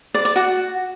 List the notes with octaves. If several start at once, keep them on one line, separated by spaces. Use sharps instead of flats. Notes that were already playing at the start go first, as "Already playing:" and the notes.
D5
D5
F#4